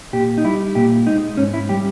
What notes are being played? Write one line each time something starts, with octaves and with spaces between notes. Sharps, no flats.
A#2 G4
D#4
G3 E4
A#2 G4
G#3 D#4
G#2 C#4
E4
G3 G4